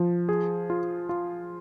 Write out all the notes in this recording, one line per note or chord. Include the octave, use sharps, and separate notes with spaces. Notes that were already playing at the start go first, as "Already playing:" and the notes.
Already playing: F3
G#4
F4
F4